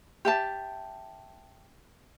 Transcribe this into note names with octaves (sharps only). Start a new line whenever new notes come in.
G4 E5 A5